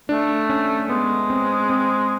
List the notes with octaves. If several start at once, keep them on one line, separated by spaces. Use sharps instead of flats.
A3 D4
C#4
G#3 B3
C4
C4